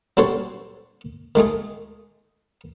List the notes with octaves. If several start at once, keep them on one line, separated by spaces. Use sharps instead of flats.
F#3 G3 D4 A4 C5 C#5
D#3 G#3 A3 G#4